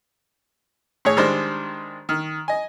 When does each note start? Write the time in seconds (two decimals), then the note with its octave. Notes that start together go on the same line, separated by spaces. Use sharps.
1.05 A2 G#4 C#5
1.17 D#3 G3 G#3 D4 C5
2.09 D#3
2.48 D#5 G#5